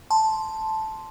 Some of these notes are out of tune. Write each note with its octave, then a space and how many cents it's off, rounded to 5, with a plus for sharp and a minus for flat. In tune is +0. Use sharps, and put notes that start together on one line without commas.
A5 -5 C6 +0